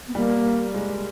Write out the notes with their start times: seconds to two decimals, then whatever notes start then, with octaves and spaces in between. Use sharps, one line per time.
0.08 B3
0.15 G3 A#3
0.74 G#3